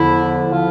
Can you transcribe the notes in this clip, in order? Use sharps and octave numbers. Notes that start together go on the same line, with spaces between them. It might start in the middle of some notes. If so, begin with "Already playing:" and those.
Already playing: E2 D3 F3 E4
D3 F3 F4